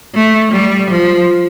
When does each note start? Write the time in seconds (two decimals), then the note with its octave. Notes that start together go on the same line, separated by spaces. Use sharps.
0.14 A3
0.53 G3
0.91 F3